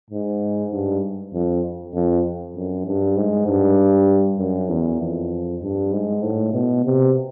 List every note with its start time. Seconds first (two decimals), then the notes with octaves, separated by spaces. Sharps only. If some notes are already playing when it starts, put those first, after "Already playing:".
0.10 G#2
0.71 G2
1.33 F2
1.94 F2
2.56 F#2
2.86 G2
3.17 G#2
3.47 G2
4.38 F#2
4.69 E2
5.01 F2
5.62 G2
5.92 G#2
6.23 A2
6.53 B2
6.85 C3